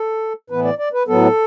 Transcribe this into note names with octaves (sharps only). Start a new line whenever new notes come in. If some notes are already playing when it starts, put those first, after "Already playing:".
Already playing: A4
A2 E3 B3 B4
D5
D5
B4
A2 F#3 B3 A4